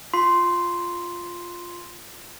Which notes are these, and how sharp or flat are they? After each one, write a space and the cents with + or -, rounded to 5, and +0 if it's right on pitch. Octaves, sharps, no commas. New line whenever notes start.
F4 +0 C6 +0